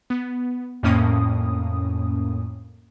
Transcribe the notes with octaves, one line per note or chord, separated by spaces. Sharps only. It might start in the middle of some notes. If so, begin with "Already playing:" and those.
B3
F2 A2 A#3 C#4 D#6